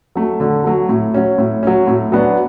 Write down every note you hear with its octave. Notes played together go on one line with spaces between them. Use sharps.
F#3 A3
D3
F#3 A3
A2
F#3 C#4
A2
F#3 C#4
A2
F#3 B3 D4